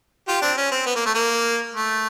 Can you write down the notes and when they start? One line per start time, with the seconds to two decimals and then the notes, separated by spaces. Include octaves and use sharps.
0.28 F4 G4
0.42 C4 D4
0.57 C#4
0.72 C4
0.86 B3
0.96 A#3
1.06 A3
1.15 A#3
1.74 A3